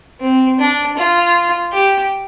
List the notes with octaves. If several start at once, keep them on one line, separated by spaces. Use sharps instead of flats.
C4
D4
F4
G4